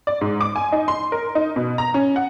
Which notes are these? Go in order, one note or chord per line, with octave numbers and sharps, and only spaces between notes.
D5
G#2
D6
G#5
D#4
C6
A#4
D#4
B2
A#5
C#4
F#5